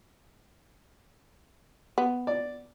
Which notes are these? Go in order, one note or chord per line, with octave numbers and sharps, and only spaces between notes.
B3
D5